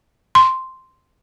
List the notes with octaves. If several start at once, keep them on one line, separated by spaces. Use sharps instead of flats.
C6